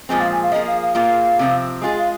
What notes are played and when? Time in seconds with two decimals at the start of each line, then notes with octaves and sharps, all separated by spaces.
0.09 A#2 F3 G#3 C4 G#5
0.20 F5
0.31 G#5
0.42 F5
0.51 F3 A#3 G#4 D#5
0.66 F5
0.81 F5
0.95 A#2 A#3 F4 G#4 F5
1.39 C3 F3 C4
1.81 G#3 F4 G#4 G#5
1.97 F5